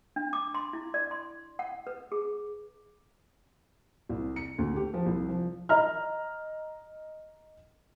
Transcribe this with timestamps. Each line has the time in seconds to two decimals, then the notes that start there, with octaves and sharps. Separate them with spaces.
0.16 D4
0.33 D6
0.55 C6
0.73 E4
0.94 D5
1.11 C6
1.59 F#5
1.87 B4
2.12 G#4
4.09 C2
4.36 C#7
4.58 D2
4.76 G4
4.94 F3
5.06 C2
5.28 F3
5.69 D#5 A#5 F6